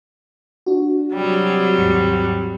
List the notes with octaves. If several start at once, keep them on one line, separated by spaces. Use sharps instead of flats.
D4 F#4
C3 F#3 G3
D#2 G#2 C#7